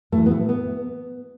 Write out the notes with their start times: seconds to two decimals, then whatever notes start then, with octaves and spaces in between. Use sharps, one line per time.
0.12 A2 A3
0.17 E3
0.26 B3
0.31 A3
0.49 B3